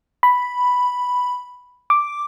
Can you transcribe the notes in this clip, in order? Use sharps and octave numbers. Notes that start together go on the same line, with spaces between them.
B5
D6